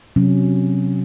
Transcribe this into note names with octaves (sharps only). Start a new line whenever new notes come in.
C3 F#3 C#4